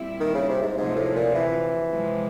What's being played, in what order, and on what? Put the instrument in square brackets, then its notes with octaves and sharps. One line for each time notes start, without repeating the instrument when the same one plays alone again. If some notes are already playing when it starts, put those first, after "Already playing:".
Already playing: [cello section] A#2 G3 C4 E4
[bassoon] D#3
C#3
C3
G#2
[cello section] D2 C3 F3 [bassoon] G#2
[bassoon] A2
A#2
E3
[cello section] C3 F3 G#3